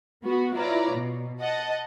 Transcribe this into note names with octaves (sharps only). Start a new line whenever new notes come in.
B3 F#4
E4 F4 B4 C#5 D5 A#5
B2
D#5 F#5 A5